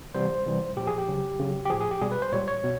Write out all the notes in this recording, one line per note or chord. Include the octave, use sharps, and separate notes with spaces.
C3 E3 G3 C5
C3 E3 G3
A#2 F3 G4
G#4
G4
C#3 F#3
C#3 F#3
G4
A2 F3 G#4
G#4
G4
B2 G3 G#4
B4
C5
A#2 G3 C#5
C#5
B2